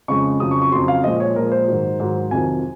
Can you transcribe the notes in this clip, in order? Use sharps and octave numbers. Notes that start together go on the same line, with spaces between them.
F2 C#3 G#3 C#6
F2 C#3 F#3 D#6
C#6
C#6
F2 C#3 F#3 C6
F5
A#2 F3 G#3 D#5
C#5
A#2 F3 G#3 A#4
C5
G#2 D#3 F#3
G#2 D#3 F#3
F2 C3 D#3 F#3 G#5